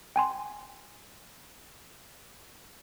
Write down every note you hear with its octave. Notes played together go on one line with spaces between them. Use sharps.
G5 G#5 C6